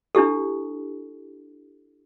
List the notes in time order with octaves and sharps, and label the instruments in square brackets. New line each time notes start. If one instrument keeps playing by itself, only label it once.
[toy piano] D4 E4 G4 A4